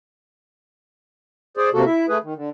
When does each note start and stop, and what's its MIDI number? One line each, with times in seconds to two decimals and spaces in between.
1.57 1.70 68
1.57 1.70 72
1.57 1.70 74
1.74 1.84 48
1.74 1.84 58
1.74 1.84 66
1.74 1.84 69
1.86 2.06 64
1.86 2.06 76
2.09 2.18 57
2.09 2.18 68
2.09 2.18 71
2.24 2.34 51
2.36 2.50 50